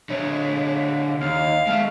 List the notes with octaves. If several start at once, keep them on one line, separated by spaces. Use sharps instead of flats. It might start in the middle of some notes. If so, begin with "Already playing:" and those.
D3 C#5
D#2 F5
G#3 E5